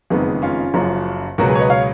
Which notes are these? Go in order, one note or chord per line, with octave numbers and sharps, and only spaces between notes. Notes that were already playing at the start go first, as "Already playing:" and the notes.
F#1 F2 D#3 G#3 B3
C#4 F4
F#1 F#2 F3
C#2 B2 F#3 B3 F#4 A#4
G#4 B4
C#5
B4 D#5
C#5 F5